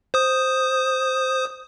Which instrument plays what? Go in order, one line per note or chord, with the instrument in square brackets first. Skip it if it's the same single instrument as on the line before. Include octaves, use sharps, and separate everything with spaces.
[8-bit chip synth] C5 D#6